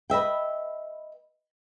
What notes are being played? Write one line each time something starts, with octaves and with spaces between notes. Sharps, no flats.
B4 D#5 E5 G5